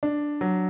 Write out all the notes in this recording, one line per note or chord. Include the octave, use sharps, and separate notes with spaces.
D4
F#3